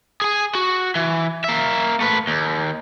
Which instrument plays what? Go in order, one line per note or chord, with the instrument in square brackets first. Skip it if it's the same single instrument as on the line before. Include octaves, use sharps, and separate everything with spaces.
[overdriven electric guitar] G#4 G#5
F#4
E3
A#3 E5
A3 B4
D#2